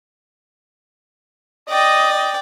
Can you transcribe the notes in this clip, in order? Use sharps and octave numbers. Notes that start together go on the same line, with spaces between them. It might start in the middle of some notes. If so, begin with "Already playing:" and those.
D5 D#5 G5